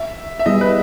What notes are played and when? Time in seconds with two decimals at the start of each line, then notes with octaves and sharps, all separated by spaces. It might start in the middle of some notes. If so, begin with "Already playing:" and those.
Already playing: E5
0.39 E5
0.46 G3 B3 E4 G#4 D#5
0.61 B4